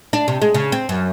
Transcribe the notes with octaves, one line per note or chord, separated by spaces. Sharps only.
D4
C3
G#3
C#3
C4
F#2